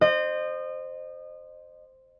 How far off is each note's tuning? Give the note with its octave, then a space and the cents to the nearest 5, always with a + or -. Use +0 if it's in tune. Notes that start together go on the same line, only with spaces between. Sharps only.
C5 +0 D#5 -30